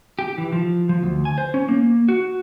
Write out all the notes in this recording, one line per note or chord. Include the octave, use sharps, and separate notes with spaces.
G4
E3
F3
F3
D2
G#5
C5
C#4
A#3
F#4